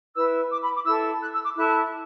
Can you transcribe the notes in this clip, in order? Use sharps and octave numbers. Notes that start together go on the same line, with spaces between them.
E4 B4 E6
D6
B5
D6
E4 A4 E6
F#6
E6
D6
E4 A4 F#6